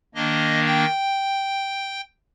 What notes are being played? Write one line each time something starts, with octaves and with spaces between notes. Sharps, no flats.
D#3 A#3 D4 D#5
G5